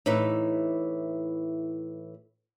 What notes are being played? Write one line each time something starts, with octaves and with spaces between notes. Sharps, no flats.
A2 E3 D#4 E4 B4